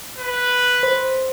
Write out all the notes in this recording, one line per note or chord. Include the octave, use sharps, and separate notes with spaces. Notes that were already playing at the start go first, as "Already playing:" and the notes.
B4
C5